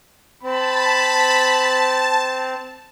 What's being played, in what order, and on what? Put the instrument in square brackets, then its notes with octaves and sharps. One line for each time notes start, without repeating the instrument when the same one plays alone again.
[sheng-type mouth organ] C4 [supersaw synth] A5 [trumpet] B5